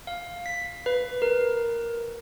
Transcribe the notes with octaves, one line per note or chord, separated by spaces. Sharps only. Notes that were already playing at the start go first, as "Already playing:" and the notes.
F5
B6
B4
A#4